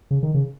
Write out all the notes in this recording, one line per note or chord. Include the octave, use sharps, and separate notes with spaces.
C#3
D#3
C#3